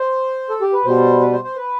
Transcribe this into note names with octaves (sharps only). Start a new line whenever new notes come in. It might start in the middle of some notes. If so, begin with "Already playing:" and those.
Already playing: C5
A4
G4
B4
B2 G3 C5
B4
C5
C5
B4